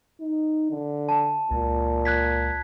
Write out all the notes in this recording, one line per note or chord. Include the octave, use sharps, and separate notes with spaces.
D#4
D3
A5
C#2 A#2
F#6 G#6 B6